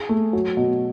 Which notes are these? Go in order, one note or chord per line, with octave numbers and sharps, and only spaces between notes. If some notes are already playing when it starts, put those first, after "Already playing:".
Already playing: G#4
A3
F#3
B2